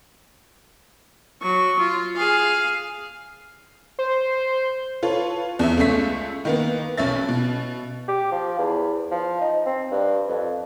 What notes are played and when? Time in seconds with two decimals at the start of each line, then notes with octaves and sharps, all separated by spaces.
1.42 F#3 C#6
1.80 F4
2.16 G#4 F5
3.99 C5
5.03 F4 A4 B4 C#5
5.59 E2 E5
5.78 C#2 A3 C#4 E5 B6
6.45 D#3 A#3 B3
6.98 B1 C#4 E5 A6
7.29 B2
8.08 G4
8.32 F3
8.59 E2
9.11 F3
9.41 D#4
9.66 C4
9.91 G2
10.28 F2